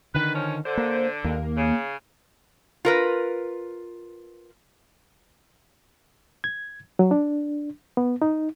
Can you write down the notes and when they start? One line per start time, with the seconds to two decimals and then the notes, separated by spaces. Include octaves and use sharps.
0.14 D3 D#3 B4
0.34 F3 C#4
0.65 D3 C5
0.77 A#3
1.24 D#2 A#3
1.57 C#3
2.85 F4 A#4 B4
6.44 G#6
6.99 F#3
7.11 D4
7.97 B3
8.22 D#4